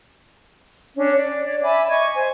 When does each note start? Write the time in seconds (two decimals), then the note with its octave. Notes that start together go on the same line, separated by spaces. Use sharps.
0.97 C#4 D4 C#5
1.16 D5
1.45 C#5 D5
1.63 E5 G#5 B5 D6
1.89 D#5 C#6 G#6
2.15 C5 G#5